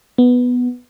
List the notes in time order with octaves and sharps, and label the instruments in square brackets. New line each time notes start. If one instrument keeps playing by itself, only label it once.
[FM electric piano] B3